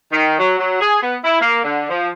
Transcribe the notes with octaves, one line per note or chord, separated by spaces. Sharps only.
D#3
F#3
F#3
G#4
B3
E4
A#3
D3
F3